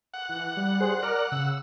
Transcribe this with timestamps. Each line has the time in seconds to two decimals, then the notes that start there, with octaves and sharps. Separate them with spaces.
0.14 F#5
0.29 E3
0.57 G3
0.81 G#4 C5
1.03 A#4 D5 F6
1.32 C#3 E6